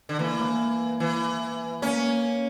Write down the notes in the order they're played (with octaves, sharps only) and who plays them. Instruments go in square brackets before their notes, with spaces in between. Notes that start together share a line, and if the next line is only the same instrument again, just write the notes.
[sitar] D3
[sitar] E3 [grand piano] A#3
[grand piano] A#3
[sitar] E3
[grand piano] A#3 [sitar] C#4